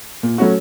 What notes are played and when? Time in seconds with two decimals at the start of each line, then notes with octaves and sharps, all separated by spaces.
0.23 A#2
0.38 F#3 A3 C#4 F#4